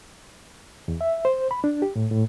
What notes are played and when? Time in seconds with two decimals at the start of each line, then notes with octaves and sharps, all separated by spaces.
0.88 E2
1.01 E5
1.25 C5
1.51 B5
1.64 D4
1.82 G4
1.96 A2
2.11 A2